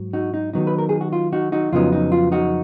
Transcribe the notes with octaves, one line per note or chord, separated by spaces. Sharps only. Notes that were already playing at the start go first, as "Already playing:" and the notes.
Already playing: G#2 F#3
D#4 F#4
D#4
D#3 F#3 B3 D#4
B4
A#4
G#4
F#4
F4
D#4 F#4
D#4 F#4
F2 C#3 F#3 B3 D#4 F4
D#4
F4
D#4 F#4